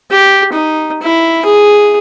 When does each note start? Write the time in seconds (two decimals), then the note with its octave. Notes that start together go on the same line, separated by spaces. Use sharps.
0.11 G4
0.53 D#4
1.02 E4
1.45 G#4